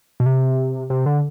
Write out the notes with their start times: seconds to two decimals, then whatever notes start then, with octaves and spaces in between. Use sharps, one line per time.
0.20 B2
0.26 C3
0.90 C3
1.06 D3